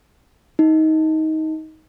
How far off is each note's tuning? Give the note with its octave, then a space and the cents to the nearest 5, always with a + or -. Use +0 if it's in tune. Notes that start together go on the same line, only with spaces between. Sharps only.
D#4 +20